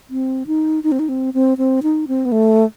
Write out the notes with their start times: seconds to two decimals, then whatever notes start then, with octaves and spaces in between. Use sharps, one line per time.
0.10 C4
0.47 D#4
0.84 D#4
0.92 C4
0.99 D#4
1.09 C4
1.34 C4
1.58 C4
1.83 D#4
2.08 C4
2.25 B3
2.32 A3